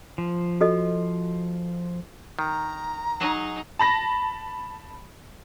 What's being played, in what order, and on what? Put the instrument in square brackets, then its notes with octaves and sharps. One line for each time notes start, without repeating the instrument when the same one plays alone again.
[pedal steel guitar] F3
[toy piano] F#4 A4 D#5
[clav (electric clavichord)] D#3 [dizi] A#5
[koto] F#3 G#4 D#5 [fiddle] D#4
[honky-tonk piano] A5 B5 A#6